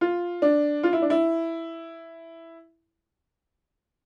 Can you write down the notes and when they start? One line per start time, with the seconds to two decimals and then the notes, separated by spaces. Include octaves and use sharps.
0.01 F4
0.42 D4
0.83 F4
0.93 E4
1.02 D4
1.10 E4